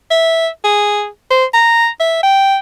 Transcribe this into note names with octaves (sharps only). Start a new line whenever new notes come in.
E5
G#4
C5
A#5
E5
G5